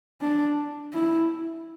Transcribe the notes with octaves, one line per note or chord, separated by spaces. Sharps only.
D4
E4